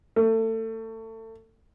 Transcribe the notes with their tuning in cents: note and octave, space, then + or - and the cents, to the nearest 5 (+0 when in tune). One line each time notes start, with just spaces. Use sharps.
A3 +30